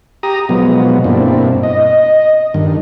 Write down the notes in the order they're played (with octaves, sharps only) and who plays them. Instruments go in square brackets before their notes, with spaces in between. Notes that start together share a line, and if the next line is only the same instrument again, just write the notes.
[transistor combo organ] G4 A#5 D#6
B2 F3 F#3 G#3 B3
G2 B2 A#3 C4 D4 E4
D#5
G2 D#3